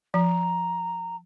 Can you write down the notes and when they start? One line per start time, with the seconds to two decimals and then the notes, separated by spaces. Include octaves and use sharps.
0.14 F3 A#5